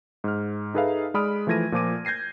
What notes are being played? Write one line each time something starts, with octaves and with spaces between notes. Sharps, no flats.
G#2 F6
D#4 G#4 A4 B4 E5 F5
G#3 D5 B5 D#6 F6 D7
E3 F3 A3 G#6 A#6 D#7
A#2 F3 D6 D#7
G6 G#6 A#6 C7 D#7